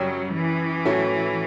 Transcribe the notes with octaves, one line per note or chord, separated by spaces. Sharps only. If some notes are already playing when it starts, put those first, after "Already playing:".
Already playing: F#2 C#3 F#3 G3 C#4 G4
E3
A2 F#3 A3 C#4